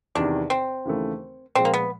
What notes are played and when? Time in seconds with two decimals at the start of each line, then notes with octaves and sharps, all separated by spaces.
0.15 E2 C3 D#3 D4
0.50 C4
0.85 D#2 C#3 E3 A3
1.55 A#2 F3 G#3 C4
1.65 A#3
1.74 B3